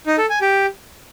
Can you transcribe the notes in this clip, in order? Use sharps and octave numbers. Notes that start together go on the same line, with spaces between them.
D#4
A4
G#5
G4